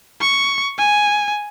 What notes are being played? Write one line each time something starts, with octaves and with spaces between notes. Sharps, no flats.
C#6
G#5